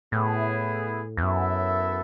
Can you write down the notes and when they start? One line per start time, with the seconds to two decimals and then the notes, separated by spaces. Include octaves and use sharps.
0.12 A2 B3 E4 G#4
1.17 E2
1.22 F#2 B3 E4 A4 E5